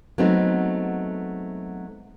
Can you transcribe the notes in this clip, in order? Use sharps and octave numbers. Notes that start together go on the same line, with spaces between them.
F#3 G#3 A3 B3 C4 D#4